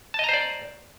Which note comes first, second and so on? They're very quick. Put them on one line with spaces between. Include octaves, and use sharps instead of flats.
A5 D#5 A#5 C5 D5